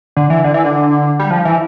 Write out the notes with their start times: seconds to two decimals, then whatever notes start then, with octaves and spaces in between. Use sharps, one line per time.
0.16 D3
0.30 E3
0.44 D3
0.54 E3
0.64 D3
1.19 G3
1.31 F3
1.45 E3